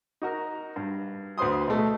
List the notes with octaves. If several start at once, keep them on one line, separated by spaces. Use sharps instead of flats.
D#4 F#4 A#4
G2
D2 B4 C5 C6 D#6
B2 A3